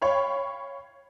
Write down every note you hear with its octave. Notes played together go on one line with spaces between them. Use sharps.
C#5 F5 G5 B5